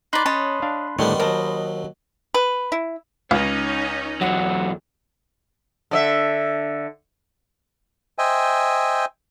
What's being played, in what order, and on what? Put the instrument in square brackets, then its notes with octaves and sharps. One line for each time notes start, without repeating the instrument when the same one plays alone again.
[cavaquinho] D#4 D5 [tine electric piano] B5 C6 F#6
[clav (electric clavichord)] C#4 [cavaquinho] C#5 D#5 A5
[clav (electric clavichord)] D4 F5
[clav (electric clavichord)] A2 D3 C#5 [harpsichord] D#3 G3 B3
[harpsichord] D#2 F#3 [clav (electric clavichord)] A#4 C5 A5 [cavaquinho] D#5
[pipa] B4
E4
[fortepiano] C#2 [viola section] C#4 D#4
[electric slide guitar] E2 F#3 [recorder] F#5
[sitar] D3 D5 E5
[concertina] C5 D#5 E5 G5 G#5